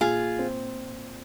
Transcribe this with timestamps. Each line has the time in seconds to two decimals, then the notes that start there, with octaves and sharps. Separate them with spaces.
0.01 A#2 F4 G#4
0.39 C4